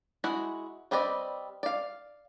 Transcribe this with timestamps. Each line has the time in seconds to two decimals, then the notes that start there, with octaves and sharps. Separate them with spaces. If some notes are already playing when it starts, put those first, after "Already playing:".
0.24 G#3 E4 F#4 F#5
0.91 G3 C4 B4 D5 D#5
1.63 D5 F5